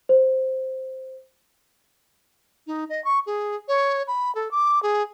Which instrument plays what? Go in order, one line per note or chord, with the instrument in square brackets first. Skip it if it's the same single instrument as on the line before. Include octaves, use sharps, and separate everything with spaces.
[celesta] C5
[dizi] D#4
D#5
C#6
G#4
C#5
B5
A4
D6
G#4